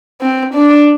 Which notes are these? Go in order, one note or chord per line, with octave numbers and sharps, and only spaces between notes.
C4
D4